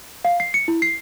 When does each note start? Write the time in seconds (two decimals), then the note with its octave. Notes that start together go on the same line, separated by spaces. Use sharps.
0.25 F5
0.40 C7
0.54 C#7
0.68 E4
0.82 C7